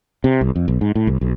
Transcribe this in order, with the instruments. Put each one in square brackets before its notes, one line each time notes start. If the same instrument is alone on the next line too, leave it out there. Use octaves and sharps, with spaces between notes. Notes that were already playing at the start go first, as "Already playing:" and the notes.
[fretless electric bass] C3
C2
F2
B1
G#2
A2
C2
B1